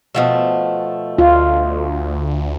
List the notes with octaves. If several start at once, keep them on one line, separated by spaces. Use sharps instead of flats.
B2 F3 A3
D2 F4